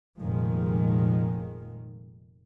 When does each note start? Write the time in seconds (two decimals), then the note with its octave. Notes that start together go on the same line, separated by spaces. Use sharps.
0.18 F1 A#2 D#3 F3 G#3